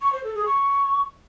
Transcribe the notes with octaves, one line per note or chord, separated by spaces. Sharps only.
C#6
C5
A4
G#4
C#6